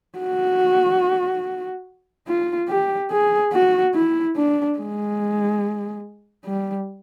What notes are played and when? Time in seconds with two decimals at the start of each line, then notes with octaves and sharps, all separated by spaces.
0.19 F#4
2.28 F4
2.69 G4
3.11 G#4
3.53 F#4
3.95 E4
4.36 D4
4.78 G#3
6.45 G3